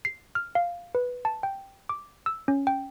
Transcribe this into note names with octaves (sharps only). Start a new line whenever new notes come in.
C7
F6
F5
B4
A5
G5
D6
E6
C#4
G5